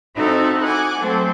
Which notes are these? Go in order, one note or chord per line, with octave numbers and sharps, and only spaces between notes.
C4 D#4 E4 F#4 A4
F#5 G#5 D6
F#3 A3 C4 A4